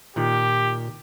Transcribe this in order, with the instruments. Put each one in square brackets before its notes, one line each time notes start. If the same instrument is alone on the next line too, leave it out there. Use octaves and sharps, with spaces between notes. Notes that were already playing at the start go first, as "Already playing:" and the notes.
[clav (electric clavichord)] A#2 D#3 [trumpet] G4